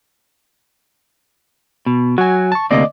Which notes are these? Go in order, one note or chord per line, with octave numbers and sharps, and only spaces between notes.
B2
F#3 F#4 G#5
A5 C#6
D2 C3 A#3 D5 D#5 D6